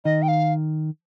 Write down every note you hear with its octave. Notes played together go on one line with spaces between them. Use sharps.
D#3 D#5
G5
F5